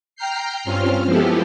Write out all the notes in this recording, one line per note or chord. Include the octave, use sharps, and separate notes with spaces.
G5 A#5 F6 G6 C7
G2 C4 C#4 F4 F6
F3 G#3 B3 E4 G4 A4